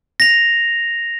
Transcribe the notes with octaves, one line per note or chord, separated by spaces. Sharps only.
A#6 F7